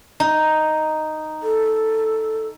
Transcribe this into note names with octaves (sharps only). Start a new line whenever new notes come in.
D#4
A4